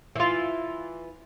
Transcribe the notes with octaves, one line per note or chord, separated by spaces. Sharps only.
E3 F4